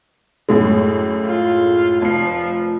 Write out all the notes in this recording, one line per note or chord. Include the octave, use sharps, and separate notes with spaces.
F#2 A2 G#3
F4
F1 F3 C7